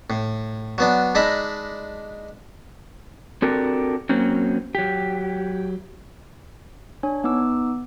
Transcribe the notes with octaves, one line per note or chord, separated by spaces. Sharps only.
A2
F#3 B3 D4
G#3 D4 D#4 E5 A#5 B5
C4 D4 F#4 G4 A4 A#4
F#3 A#3 C4 C#4
F#3 G4
D4 C#5 G#5
B3 D#4 D6 E6